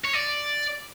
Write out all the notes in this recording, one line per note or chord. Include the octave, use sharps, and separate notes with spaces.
C#5
D5